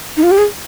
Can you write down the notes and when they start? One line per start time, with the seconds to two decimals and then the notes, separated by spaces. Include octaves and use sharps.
0.17 D#4
0.23 F4
0.31 G4
0.38 G#4